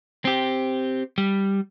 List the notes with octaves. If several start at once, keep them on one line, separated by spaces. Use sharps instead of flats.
C4 G4
G3